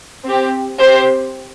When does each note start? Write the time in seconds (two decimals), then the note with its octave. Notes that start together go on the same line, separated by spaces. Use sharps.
0.24 C4 G4
0.79 C4 G4 C5